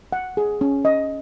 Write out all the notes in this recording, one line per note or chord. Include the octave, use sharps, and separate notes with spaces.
F#5
G#4
C#4
D#5